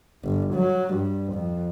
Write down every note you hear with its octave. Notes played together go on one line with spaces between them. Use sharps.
G1
F#3
G2
F2